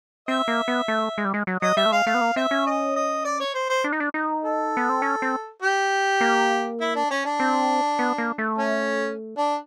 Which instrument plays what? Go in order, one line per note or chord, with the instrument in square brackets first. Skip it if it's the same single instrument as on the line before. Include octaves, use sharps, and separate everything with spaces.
[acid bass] C4 [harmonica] E5
[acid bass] A#3
B3
A3
G#3
G3
G#3
F#3
[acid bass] F#3 [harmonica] D#5
[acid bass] G3 [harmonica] E5
[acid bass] A3
[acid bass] G#3 [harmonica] F5
[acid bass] A3 [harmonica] F5
[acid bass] B3
A#3
[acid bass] C4 [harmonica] E5
[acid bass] C#4
[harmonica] D#5
D#5
D5
C#5
C5
C5
[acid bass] D4
D#4
D4
D#4
[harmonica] A4
[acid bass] B3
C4
C#4
C4
[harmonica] G4
[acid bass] A#3
[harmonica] E4
D4
C#4
D4
[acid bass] C4
B3
A#3
A3
[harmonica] C#4
D4